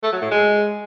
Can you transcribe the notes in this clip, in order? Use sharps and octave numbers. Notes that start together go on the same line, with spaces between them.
A3
F#3
A2
G#3